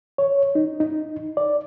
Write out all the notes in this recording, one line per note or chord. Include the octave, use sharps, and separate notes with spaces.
C#5
D#4
D#4
D5